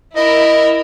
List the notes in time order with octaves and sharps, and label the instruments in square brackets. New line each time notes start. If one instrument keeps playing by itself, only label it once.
[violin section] E4 A#4 E5 [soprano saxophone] D#5